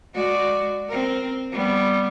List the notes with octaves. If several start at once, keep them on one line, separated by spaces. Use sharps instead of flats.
G#3 F#4 D5
C4 A#4
G3 B3